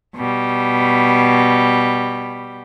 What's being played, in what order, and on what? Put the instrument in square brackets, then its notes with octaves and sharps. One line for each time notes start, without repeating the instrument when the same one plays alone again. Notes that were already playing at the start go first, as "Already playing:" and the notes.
[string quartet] B2 G3